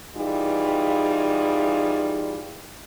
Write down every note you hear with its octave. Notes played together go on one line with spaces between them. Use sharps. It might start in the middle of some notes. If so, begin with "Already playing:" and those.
E3 G3 D#4 F4 G#4